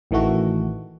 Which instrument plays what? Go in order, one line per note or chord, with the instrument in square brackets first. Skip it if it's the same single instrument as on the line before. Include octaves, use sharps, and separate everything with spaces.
[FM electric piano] A1 D#3 E3 A3 F#4